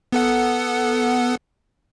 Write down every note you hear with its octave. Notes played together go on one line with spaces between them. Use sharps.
B3 A4 F#5